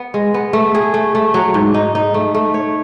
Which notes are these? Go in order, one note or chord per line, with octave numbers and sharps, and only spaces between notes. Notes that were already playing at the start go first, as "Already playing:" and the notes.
Already playing: B3
G#3
B3
A3
G#4
A3
A3
F#3
G#2
D#4
D#4
A3
A3
C#5